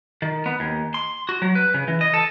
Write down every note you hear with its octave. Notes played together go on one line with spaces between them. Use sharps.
D#3
B3
D#2
C6
F#4
F#3
B4
C#3
E3
D#5
A4